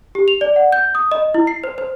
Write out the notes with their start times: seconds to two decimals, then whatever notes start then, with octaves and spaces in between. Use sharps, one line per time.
0.15 G4
0.28 F7
0.41 D5
0.56 F#5
0.72 G6
0.95 D#6
1.11 D#5
1.34 E4
1.47 C7
1.64 C5
1.78 C5